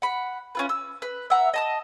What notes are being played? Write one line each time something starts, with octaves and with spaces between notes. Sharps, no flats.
F#5 B5
C#4 F4 B4
E6
B4
E5 F#5 A#5
D#5 A5 D#6